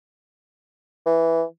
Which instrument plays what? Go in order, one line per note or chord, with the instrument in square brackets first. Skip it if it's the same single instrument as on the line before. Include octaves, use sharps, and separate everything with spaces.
[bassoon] E3